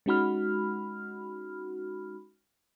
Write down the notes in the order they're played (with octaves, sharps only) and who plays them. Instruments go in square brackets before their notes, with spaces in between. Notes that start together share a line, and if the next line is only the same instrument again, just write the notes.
[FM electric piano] G#3 C#4 D#4 F#4 B5 F6